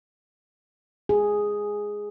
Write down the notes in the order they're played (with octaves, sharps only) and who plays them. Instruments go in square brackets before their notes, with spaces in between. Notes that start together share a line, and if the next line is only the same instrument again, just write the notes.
[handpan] G#4